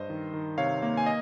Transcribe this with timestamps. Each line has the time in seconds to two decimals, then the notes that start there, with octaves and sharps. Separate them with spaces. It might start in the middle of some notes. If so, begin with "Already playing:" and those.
Already playing: G2 C5 D#5
0.10 D#3
0.34 D#3
0.58 C3 C#5 F5
0.82 A#3
0.97 G#5
1.06 D#5